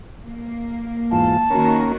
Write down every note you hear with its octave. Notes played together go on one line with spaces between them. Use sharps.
A#3
E2 G#2 F4 A5
D#3 A#3 C#4 F#4 A#4